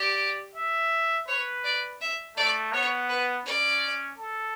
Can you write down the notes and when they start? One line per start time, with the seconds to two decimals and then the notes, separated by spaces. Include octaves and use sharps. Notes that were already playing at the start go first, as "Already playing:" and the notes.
Already playing: G4 D5
0.56 E5
1.28 B4 C#5
1.64 D5
2.01 E5
2.37 A3 D5
2.72 B3 C#5
3.09 B4
3.45 C#4 D5
4.18 A4